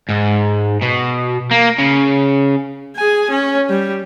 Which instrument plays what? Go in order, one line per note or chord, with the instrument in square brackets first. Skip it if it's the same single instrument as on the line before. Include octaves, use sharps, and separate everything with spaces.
[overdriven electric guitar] G#2
B2
A#3
C#3
[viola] G#4 G#5
C#4
G3